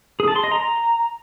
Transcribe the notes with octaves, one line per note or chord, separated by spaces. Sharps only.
G#4
A5
C6
D#5
A#5